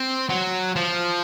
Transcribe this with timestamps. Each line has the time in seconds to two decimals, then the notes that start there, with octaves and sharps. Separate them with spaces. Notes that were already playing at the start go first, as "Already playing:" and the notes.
Already playing: C4
0.30 F#3
0.76 F3